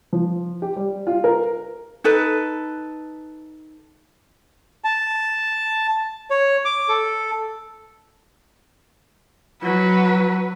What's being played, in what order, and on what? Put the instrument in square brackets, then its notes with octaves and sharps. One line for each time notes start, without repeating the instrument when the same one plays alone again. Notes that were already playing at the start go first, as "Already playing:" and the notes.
[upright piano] F3
G4
G3
F4
A#4
[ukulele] D#4 A4 B4
[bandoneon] A5
C#5
D6
A4
[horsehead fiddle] F#3 B4